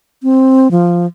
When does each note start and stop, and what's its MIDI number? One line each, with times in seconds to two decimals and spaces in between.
0.23 0.70 60
0.71 1.06 53